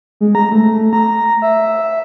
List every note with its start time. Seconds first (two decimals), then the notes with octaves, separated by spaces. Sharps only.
0.21 G#3
0.35 A#5
0.52 A3
0.93 A#5
1.42 E5